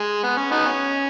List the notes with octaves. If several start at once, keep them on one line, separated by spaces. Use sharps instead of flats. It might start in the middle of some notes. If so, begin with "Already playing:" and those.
Already playing: G#3
B3
C#4
B3 D#4
C#4